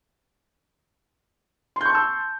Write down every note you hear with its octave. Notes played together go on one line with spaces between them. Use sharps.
A5 C6 C#6 E6 G6